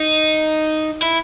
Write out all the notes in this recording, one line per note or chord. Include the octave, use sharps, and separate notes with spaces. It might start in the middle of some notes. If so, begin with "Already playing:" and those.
Already playing: D#4
E4